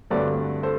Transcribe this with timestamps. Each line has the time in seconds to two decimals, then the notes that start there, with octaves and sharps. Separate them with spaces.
0.10 G2 D3 F#3 A3 C4 B4 D5
0.63 A4 C5